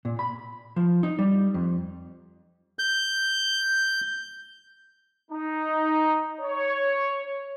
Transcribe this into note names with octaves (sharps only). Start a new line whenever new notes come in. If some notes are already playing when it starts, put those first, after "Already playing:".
A#2
B5
F3
D#4
G3
F2
G6
D#4
C#5